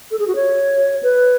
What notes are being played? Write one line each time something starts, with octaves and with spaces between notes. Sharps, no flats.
A4
G#4
F#4
C#5
B4